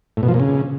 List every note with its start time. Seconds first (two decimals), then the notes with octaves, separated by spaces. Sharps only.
0.17 A2
0.23 B2
0.28 F3
0.34 A#2
0.40 C#3